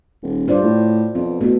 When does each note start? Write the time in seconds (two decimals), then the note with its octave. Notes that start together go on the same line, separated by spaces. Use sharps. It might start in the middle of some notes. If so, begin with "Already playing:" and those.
0.23 D#1
0.48 G2 F4 C5 D5
0.63 A2
1.15 F2 B3
1.41 B2 A3 B3 E4